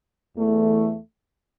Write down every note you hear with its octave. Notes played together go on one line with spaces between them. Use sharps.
E2 E3 A3